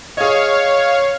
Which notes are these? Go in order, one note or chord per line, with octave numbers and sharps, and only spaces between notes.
G#4 C#5 D#5 F5